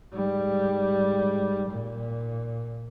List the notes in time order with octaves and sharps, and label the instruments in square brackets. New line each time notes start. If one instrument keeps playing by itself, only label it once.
[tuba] G#2 [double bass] G3
[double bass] A#2